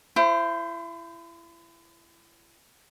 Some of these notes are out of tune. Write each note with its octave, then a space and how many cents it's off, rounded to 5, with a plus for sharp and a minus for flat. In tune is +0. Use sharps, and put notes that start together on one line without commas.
E4 +35 C5 +0